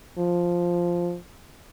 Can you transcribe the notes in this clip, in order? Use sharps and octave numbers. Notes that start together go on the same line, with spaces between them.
F3